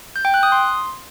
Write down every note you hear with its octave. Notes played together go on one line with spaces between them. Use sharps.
G6
G5
F#6
D#6
C6